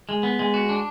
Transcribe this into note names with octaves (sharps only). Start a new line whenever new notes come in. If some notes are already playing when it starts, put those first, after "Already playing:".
G#3
B3
G#3
F#4
D4